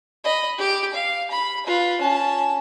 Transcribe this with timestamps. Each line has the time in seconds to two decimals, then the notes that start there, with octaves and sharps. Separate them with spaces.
0.24 D#5 B5
0.58 G4 D6
0.94 F5
1.31 B5
1.66 F4 B4
2.01 C#4 A5